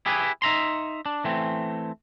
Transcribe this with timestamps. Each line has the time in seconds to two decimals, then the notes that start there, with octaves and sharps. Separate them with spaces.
0.06 E4 G4 G#4 B4
0.42 D#4 E5 A#5 C6
1.06 D4
1.24 E3 A3 C4